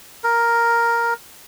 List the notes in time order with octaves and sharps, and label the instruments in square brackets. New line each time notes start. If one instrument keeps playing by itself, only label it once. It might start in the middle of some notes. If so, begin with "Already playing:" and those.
[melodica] A#4